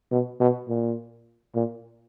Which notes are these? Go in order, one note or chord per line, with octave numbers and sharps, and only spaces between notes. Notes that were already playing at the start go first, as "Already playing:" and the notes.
B2
B2
A#2
A#2